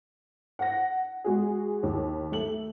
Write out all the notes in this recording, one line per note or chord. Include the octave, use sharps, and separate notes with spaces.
F#5 A#6
G#3 F#4 G#4
D#2
A3 F#7